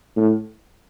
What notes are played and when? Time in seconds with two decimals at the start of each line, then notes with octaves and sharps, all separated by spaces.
0.16 A2